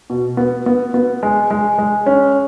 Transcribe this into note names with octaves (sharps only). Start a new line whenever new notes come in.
B2
B3
B3
B3
G#3
G#3
G#3
C#4